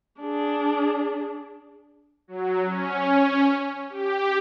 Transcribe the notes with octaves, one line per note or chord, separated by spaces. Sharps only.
D4 G#4
F#3
C#4
G4